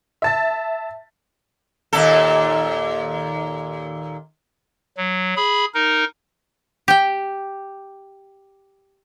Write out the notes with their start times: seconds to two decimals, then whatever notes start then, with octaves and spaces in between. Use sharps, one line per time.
0.22 E5 A5 A6
1.93 D#2 A#2 A4
4.97 F#3
5.36 G#4 B5
5.74 D#4 A#4
6.88 G4 G5